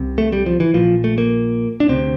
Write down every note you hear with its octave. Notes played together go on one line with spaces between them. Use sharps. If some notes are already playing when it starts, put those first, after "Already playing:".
Already playing: C2 C3
A3
G3
F3
E3
A#1 A#2 F3
A3
A#3
D4
D2 C3 C4